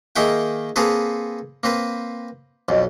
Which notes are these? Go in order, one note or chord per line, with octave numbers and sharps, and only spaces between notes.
D#3 A#3 G#4 E5 F#5 G5
A#3 C4 G#4 A4 B4
A#3 C4 B4
B1 F2